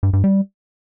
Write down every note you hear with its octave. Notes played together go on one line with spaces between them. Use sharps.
G2
G2
G3